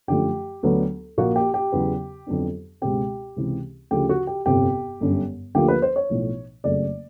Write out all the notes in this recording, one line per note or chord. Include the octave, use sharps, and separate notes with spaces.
F#2 D3 F3 A3 G4
D2 D3 F#3 B3 D4
A#1 A#2 F3 A#3 F#4
G4
G4
E2 C#3 F#3 B3
F2 D3 F#3 B3 D4
C#2 B2 G#3 C4 G4
C#2 C3 E3
D2 C#3 F3 G4
F#4
G4
G1 F2 C3 G4
G1 F#2 D3 G3
D2 D3 F3 A#3 G4
B4
C5
C#5
B1 A2 F3
F#1 F2 C#3 F#3 A3 D5